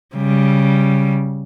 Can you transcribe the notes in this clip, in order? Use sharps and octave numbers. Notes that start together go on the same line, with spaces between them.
C#3 G3